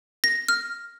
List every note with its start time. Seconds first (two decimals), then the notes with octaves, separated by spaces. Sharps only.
0.24 A#6
0.48 F6